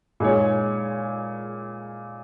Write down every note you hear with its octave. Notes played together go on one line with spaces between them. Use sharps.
A#2 G#3 D#4 G#4 C#5